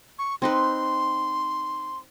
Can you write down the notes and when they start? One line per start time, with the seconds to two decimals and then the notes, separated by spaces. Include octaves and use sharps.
0.19 C#6
0.42 C4 D#4 B4 C6